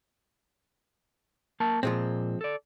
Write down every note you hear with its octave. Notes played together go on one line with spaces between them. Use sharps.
A#3 A#4 A5
A#2 F3 G#3 C4
A4 D5